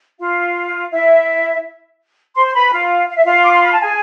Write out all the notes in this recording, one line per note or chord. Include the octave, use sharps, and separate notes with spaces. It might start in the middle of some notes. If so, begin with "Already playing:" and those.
F4 F5
E4 E5
C5 C6
C6
B4 B5
F4 F5
F5
E5
F4 F5
D6
C6
B5
A5
G#4 G#5